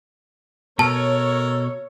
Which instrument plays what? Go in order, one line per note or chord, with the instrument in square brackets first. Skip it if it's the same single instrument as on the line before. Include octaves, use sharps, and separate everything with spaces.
[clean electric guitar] B2 [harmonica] A4 A#4 [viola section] C#5 [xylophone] A5